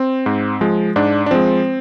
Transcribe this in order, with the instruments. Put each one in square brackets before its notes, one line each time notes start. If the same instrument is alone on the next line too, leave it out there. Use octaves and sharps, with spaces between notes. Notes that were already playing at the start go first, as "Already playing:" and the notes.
Already playing: [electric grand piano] C4
G#2
F3 G#3
G#2 D4
D4
F3 G#3 C4